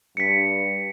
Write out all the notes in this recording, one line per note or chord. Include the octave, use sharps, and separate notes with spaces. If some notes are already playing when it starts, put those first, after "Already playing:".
G2 B6 C#7